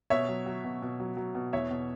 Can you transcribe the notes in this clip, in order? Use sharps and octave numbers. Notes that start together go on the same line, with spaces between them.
B2 C#5 E5
F#3
F#3
B2
B2
F#3
F#3
B2
E2 C#5 E5
B2